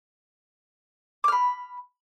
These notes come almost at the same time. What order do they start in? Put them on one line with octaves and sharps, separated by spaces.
D6 F6 B5